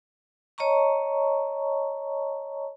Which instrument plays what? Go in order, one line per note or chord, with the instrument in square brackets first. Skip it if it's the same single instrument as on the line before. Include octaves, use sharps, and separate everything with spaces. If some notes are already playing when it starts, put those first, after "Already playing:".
[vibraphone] C#5 D#5 A5 A#5 C#6